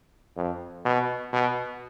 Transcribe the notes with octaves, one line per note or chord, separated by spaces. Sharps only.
F2
B2
B2